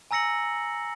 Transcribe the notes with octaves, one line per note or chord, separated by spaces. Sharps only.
G#5 A#5 E6 A#6 C#7 F#7